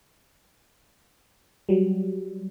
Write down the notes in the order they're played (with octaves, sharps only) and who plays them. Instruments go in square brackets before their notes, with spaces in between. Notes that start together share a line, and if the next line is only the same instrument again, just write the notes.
[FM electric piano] F#3 G3